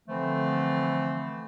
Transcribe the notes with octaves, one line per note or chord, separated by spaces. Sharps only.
D3 E3 F3 A3 C4